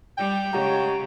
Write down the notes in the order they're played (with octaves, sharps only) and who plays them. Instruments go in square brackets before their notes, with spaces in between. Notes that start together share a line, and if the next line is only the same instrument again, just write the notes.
[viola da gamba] G3 [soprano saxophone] G5
[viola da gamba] C#3 G#3 [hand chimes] G4 F#5 A#5